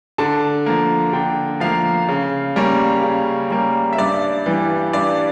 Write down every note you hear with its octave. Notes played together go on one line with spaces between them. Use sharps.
D3 A5
F3 A#3
D3 G5
F3 A#3 F5
C#3
G3 A#3 C#4
C#3
G3 A#3 C#4
E5
G2 D5
E3 G3
G2 D5